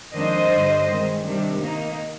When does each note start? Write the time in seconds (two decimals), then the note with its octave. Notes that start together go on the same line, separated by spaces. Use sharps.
0.12 F2 D#3 G#3 D4 C5 D#5
0.50 G2 D3 G3 D4
0.86 D#3 G#3 C4
1.23 C3 D#3 G3 D4
1.59 D#3 A#3 D#4